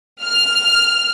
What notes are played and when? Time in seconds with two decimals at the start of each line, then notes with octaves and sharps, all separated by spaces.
0.23 F6